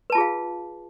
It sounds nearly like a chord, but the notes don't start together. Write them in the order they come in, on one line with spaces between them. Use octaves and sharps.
B4 A5 F4 G#4 F5